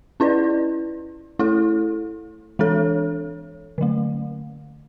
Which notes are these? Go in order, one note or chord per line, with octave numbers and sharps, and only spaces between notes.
C#4 E4 B4 D5
A3 E4 A4
E3 G#3 D4 A4 C#5
D3 F#3 A3